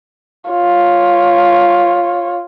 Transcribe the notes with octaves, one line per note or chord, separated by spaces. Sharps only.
F4 C#5